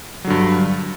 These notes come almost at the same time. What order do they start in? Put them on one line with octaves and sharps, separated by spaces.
F#3 D3 G2